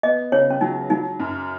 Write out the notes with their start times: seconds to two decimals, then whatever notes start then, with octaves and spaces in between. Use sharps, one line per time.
0.03 B3 D#5
0.32 C#3 C#5
0.50 C#4
0.61 F#3 D#4
0.90 F#3 D#4
1.20 F#2